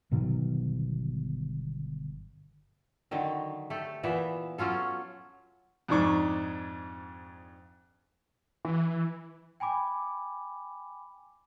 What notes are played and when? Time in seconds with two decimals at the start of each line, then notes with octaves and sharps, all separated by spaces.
0.11 G1 B2 D#3 F#3
3.11 D3 D#3 F#3
3.70 A3 G4 A4
4.03 A#2 E3 B3 E5
4.58 F#3 C#4 F4 A4
5.88 F2 G#2 D4 D#4 C#6 D6
8.65 E3
9.60 G5 G#5 B5 D6